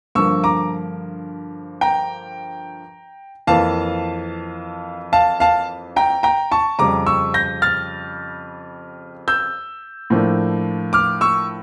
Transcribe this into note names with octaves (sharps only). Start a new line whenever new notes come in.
G2 D3 F3 A#3 C#6 E6
A#5 D6
G5 A#5
F2 E3 A#3 F5 A5
F5 A5
F5 A5
G5 A#5
G5 A#5
A5 C#6
F2 C#3 G3 A#5 D6
C#6 E6
G6 A#6
F6 A6
E6 G6
A2 F3 A#3 D4
D6 F6
C#6 E6